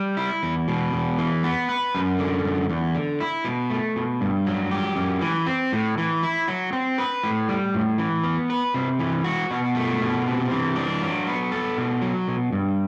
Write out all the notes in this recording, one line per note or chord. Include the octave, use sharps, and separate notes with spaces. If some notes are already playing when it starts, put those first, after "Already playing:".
Already playing: G3
E4
E2
B2
E2
E3
B3
B4
F#2
D3
F#2
E2
D3
E4
B2
A3
B2
G2
F#3
G4
F#2
E3
C4
A2
E3
E4
F#3
C4
B4
A2
G3
A2
E3
B3
B4
C3
E3
F#4
B2
A3
B2
C3
E3
D4
F#3
B3
A4
B2
F#3
B2
G2